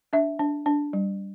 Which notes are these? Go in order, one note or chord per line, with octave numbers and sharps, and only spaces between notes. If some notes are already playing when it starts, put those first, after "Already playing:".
D4 E5
D4
D4
G3